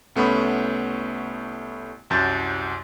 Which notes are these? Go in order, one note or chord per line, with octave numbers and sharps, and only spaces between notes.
C2 A3 B3 C#4 B5 D#6
C2 F#2 A5 G6 A6